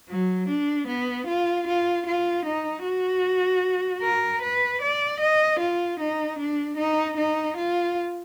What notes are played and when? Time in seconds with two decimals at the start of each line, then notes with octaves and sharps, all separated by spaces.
0.09 F#3
0.48 D4
0.87 B3
1.27 F4
1.67 F4
2.06 F4
2.46 D#4
2.84 F#4
4.02 A#4
4.42 B4
4.82 D5
5.21 D#5
5.60 F4
6.00 D#4
6.39 D4
6.77 D#4
7.17 D#4
7.57 F4